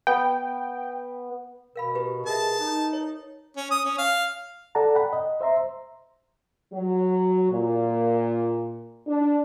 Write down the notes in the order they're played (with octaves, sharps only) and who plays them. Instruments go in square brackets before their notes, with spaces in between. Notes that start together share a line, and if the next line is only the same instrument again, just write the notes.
[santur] B3 [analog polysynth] G5
[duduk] B2 [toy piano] A#4 F5 B5
[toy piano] E4 G4 B4
[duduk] G#4 [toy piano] A#4 D#5 E5 [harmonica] A5
[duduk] D#4
[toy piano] C#5
[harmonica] C#4
D#6
C#4
F5
[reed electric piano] A4 D5 F#5 A5 A#5
F#5 G5 B5
D#5
C5 E5 A#5 C6
[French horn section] F#3
A#2
D4